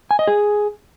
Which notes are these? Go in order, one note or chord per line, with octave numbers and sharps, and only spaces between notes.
G#5
D#5
G#4